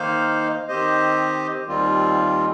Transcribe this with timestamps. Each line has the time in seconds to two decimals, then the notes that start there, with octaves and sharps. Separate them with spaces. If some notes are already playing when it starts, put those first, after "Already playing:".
Already playing: D#3 A#3 D#4 C5 F5
0.68 D#3 C4 G4 C5 D#5
1.67 D#2 D#3 G3 C4 F4